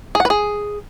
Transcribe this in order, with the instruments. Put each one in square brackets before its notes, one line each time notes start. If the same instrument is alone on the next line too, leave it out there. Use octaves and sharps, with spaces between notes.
[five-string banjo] G#4
F#5
B4
G#4